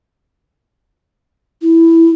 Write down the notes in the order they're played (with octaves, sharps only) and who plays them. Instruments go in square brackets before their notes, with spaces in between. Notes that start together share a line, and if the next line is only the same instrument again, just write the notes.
[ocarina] E4